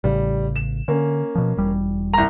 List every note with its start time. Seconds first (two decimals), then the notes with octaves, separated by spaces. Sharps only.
0.04 A1 C#3 G3
0.56 E7
0.88 D3 A#3 C#4
1.35 B2 F3
1.57 E1 G3
2.14 C2 A#5